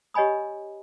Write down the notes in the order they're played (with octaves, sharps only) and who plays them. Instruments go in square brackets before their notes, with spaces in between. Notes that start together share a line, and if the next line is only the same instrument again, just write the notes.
[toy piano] G4 C#5 D#5 G#5 B5 D#6